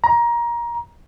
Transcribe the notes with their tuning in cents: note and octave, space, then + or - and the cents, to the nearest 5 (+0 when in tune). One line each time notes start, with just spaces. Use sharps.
A#5 +20